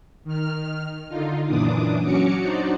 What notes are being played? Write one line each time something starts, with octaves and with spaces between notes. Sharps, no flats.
D#3 F6
D3 D#4 F4
F#2 A#2 E3 D4 D6 D#6
F#3 C#4 F#4 C#5 D6 C#7
D4 D#4 F#4 C5 D5